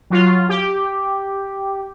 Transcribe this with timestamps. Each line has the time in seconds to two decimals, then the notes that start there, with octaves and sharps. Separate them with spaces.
0.10 F#3 F4
0.49 G4